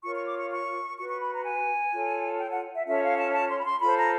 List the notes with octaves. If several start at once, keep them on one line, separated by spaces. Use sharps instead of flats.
F4 A#4 C#5 C#6
C#6
D6
C#6
C#6
F#4 B4 C#6
C#6
B5
A#5
G#5
F4 A4 C#5
G5
F#5
E5
C#4 F4 A4 C#5 E5
F5
A5
A5
C6
B5
C6
F4 A4 C5 B5
A#5